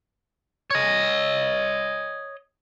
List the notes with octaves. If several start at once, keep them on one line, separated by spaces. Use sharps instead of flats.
C#5 D#5